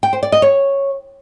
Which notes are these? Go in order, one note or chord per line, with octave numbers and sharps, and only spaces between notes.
G5
C5
D5
D#5
C#5